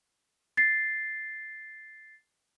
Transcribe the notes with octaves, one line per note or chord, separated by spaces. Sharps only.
A6 C7